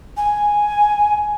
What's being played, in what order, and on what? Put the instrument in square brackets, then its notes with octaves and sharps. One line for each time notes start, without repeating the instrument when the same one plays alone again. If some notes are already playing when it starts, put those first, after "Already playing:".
[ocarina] G#5